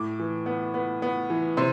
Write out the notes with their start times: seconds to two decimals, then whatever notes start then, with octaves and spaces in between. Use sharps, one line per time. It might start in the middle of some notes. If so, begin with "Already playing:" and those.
Already playing: A2 D6
0.20 E3
0.46 B3
0.74 B3
1.02 B3
1.30 E3
1.57 C3 C6